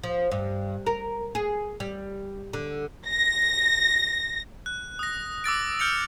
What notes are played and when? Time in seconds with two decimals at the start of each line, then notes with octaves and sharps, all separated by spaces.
0.04 F3
0.32 G2
0.86 A#4
1.35 G#4
1.80 G3
2.53 D3
3.08 A#6
4.66 F#6
4.99 D#6 A#6
5.44 D6 E6 A6 D7
5.79 F6 G6 C#7 D7 F7